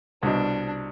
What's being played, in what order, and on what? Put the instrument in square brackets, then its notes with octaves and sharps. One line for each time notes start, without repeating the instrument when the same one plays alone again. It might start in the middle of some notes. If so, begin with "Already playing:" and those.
[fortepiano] C2 B2 [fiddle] D4